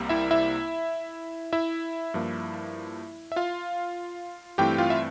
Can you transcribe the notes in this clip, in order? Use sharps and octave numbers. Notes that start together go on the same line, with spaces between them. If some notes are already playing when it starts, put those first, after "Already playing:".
Already playing: C2 C3 G3 A#3
E4 E5
E4 E5
E4 E5
G2 F3 A#3
E5
F4 F5
G2 E3 A3 C4 E4 G4 G5
F4 F5
E5